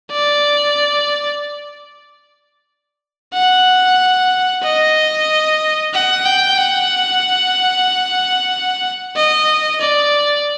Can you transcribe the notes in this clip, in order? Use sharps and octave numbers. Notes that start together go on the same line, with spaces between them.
D5
F#5
D#5
F#5
G5
F#5
D#5
D5